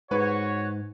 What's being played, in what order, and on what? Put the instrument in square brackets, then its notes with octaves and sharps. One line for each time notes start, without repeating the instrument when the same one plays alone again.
[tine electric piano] G#2 [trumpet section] F#4 C#5 [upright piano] B4